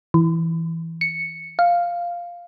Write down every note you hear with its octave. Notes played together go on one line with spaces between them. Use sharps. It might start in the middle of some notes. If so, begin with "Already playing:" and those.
E3
C#7
F5